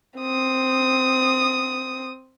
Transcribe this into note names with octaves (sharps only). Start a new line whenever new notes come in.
C4 D#6